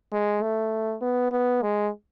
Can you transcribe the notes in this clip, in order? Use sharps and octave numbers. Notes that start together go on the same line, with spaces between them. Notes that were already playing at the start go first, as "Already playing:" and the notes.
G#3
A3
B3
B3
G#3